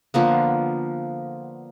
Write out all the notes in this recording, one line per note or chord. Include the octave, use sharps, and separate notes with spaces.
D3 F3 A#3 B3